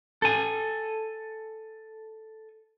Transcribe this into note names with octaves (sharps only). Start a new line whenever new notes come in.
A4 G#5